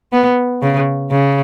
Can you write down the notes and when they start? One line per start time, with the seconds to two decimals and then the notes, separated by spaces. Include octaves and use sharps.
0.13 B3
0.62 C#3
1.11 C#3